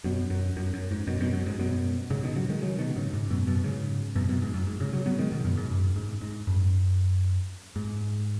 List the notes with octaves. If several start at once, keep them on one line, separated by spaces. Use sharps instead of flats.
F#2 B2
F#2
F#2
F#2
G#2
F#2 B2
F#2 B2
F#2
G#2
F#2 B2
G#2 C#3
B2 D#3
C#3 F#3
D#3 G#3
C#3 F#3
B2 D#3
G#2 C#3
G#2
F#2 B2
F#2 B2
G#2 C#3
F#2 B2
F#2 B2
G#2
F#2
G#2
G#2 C#3
C#3 F#3
F#3 B3
D#3 G#3
B2 D#3
F#2 B2
G#2
F#2
G#2
G#2
F#2
G#2